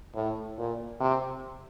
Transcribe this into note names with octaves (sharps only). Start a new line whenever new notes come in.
A2
A#2
C3